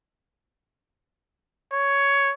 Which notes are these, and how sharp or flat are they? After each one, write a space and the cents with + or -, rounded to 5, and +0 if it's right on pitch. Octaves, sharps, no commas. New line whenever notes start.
C#5 +10